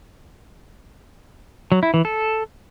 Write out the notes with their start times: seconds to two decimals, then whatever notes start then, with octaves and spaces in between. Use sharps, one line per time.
1.72 F#3
1.83 E4
1.94 E3
2.05 A4